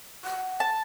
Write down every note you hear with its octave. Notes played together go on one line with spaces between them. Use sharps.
F#5
A5